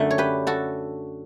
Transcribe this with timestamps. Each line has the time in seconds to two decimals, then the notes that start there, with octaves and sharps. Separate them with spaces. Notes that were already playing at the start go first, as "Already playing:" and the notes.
Already playing: F#2 D3 A3 A4
0.11 C#5
0.18 G4 B4
0.47 F#4 A4